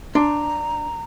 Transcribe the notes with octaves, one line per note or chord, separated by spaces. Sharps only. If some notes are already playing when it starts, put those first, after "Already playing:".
D4 A#5 C6